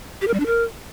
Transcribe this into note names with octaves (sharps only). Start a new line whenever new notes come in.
G4
A#4
G3
D4
A#4